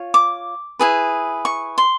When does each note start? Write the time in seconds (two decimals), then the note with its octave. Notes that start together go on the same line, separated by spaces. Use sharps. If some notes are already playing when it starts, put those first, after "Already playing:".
Already playing: F4 C#5
0.14 D6
0.79 E4 G#4 B4
1.45 C#6
1.78 C6